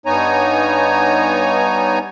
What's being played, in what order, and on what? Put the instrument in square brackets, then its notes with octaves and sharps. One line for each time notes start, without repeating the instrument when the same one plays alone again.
[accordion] G2 B3 D#4 C#5 G#5 A#5